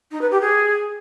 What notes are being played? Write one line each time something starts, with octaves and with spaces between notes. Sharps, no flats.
D#4
B4
G4
G#4